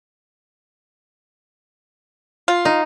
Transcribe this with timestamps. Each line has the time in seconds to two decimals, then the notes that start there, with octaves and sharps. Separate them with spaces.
2.48 F4
2.65 D#4